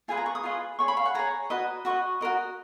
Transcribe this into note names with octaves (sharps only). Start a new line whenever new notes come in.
F4 G#4 B4 D#5 G#5
A#5
C#6
D#6
F4 G#4 B4 D#5
G#4 C#5 C#6
B5
F5
F#5
G#4 C#5 A#5
F#4 B4 D#5
F#4 B4 D#5 C#6
F#4 A#4 D#5